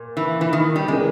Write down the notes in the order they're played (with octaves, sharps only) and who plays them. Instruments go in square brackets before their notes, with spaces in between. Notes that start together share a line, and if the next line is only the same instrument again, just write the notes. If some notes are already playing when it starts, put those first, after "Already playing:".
Already playing: [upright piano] A#2
[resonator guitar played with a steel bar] E3
E3
D#3
G3
[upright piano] C#3 E3 A#3 [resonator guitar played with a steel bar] G#3